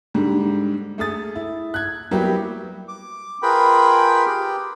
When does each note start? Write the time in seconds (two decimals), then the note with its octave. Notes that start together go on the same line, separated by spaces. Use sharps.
0.14 G#2 D3 G3
0.98 A3 G#4 D#6 A6
1.35 E4
1.74 F#6 G#6
2.11 F#3 G3 A#3 B3 E4 G4
2.88 D6
3.43 F4 G#4 A#4 B4 G5 B5
4.26 G4 G5